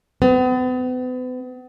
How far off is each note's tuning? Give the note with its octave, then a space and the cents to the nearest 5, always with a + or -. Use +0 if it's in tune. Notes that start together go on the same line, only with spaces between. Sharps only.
B3 +40